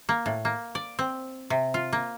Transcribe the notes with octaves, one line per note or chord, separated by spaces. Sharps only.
A#3
A2
A#3
D5
C4
C3
F4
A#3